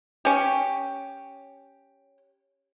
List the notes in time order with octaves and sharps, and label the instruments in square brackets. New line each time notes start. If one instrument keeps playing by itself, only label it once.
[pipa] C#4 G4